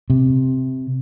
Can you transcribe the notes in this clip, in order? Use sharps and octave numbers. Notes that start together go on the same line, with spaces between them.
C3